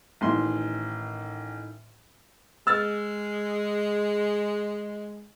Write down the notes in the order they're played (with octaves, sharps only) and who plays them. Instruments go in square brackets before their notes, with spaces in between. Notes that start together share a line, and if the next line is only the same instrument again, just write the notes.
[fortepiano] A1 C6 [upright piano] A2 D#3
[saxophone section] G#3 [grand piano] E6 F6 A6